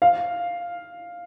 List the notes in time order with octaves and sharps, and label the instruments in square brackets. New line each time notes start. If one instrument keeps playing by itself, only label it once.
[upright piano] F5